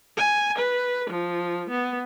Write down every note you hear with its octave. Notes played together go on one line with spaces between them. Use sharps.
G#5
B4
F3
B3